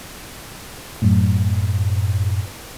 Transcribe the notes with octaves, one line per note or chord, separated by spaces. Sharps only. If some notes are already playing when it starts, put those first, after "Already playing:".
F#2 A2